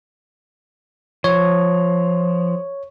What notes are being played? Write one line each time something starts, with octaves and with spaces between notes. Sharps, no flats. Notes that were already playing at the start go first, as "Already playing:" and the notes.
F3 C#5